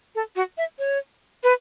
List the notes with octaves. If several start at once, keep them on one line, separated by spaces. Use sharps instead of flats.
A4
F#4
E5
C#5
B4